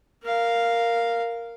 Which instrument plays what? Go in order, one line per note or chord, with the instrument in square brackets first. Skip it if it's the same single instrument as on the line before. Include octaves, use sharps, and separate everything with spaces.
[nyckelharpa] A#4 F5